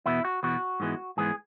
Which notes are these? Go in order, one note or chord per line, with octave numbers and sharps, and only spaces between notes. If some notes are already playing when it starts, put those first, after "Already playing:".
E2 B2 B3 E4
F#4
E2 B2 B3 F#4
G#2 E3 G#3 B3
G#2 E3 G#3 B3 G#4